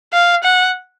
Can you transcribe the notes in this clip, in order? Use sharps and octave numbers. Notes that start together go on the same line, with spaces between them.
F5
F#5